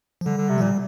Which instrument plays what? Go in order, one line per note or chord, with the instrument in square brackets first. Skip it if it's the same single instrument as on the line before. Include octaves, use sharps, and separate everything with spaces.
[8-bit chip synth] F3
[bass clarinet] D3 [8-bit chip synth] G3
[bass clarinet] D3
C3
[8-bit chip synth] F3
[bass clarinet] A#2 [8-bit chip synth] G3